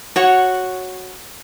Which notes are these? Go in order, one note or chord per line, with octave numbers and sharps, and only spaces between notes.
F#4 C#5 F#5